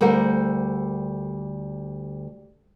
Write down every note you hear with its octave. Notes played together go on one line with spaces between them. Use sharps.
D2 G3 A4 A#4 C5 F#5